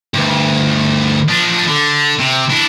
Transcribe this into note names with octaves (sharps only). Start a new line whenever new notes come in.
D2 G2
F3 D4
D3
C3
D4 E4